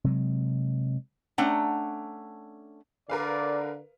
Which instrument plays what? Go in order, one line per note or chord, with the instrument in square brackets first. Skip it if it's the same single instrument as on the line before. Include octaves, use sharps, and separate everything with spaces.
[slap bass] C3 F#3 G#3
[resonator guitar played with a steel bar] A3 C#4 D4 F#5 G5 A#5
[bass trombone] D3 [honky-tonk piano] A#4 B4 F5 [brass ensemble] D5